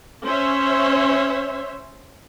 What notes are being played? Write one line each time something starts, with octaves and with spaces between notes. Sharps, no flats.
C#4 C5 C#5 E5